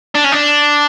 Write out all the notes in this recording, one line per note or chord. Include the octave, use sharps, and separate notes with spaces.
D4
C#4
D4